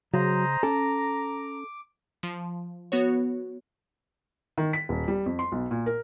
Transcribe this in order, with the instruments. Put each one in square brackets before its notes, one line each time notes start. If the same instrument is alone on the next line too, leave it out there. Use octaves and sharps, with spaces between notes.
[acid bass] C#3 [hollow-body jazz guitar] F#3 [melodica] C5 D#5 [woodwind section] A#5
[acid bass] C#4 [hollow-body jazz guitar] A4 [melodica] D6
[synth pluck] F3
B3 F#4 C#5
[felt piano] D#3
B6
D#1
G3
F2
C6
B1
A#2
A#4